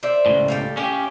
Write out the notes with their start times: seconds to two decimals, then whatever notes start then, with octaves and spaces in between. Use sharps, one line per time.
0.03 C5 D5 E5
0.26 C#2 A2
0.48 G4 A4 F5
0.77 C#4 G4 E5 F5